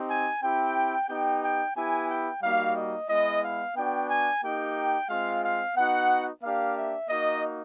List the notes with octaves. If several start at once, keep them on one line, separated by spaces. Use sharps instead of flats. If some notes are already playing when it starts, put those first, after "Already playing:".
Already playing: C4 D#4 G4
G#5
C4 E4 G4 G5
B3 D#4 G4 G5
G5
B3 E4 G4 G#5
G5
G3 A#3 D#4 F#4 F5
D#5
G#3 B3 E4 D#5
F5
B3 D4 F#4 G5
G#5
A#3 D#4 G4 G5
G#3 C4 F4 F5
F5
B3 D#4 F#4 F#5
A#3 D4 G4 F5
E5
A#3 D#4 F#4 D#5